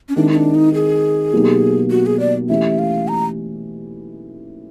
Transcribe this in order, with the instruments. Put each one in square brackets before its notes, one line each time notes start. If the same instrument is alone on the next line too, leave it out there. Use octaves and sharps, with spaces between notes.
[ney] C#4
[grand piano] D#3 G#3 C4 E4 [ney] D4
[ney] D#4
D4
D#4
G#4
[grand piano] B2 F#3 A#3 D#4 G4
[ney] F#4
G#4
D5
[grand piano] E3 A3 C#4 E4 G4 [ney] E5
[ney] F5
A#5